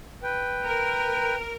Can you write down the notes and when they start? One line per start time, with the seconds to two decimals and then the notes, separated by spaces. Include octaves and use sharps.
0.23 B4 G5
0.65 A#4